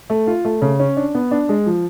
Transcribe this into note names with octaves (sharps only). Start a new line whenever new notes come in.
A3
F4
A3
C#3
C#4
D4
B3
D4
G#3
F3